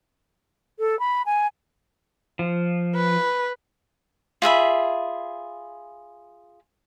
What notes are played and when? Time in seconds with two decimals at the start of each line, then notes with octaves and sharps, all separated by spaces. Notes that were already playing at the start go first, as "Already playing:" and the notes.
0.79 A4
0.99 B5
1.26 G#5
2.39 F3
2.95 B4
4.42 F4 G#4 E5 B5